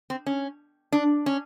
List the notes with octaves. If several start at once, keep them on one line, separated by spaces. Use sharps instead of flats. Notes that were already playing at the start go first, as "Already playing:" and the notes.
C4
C#4
D4
C#4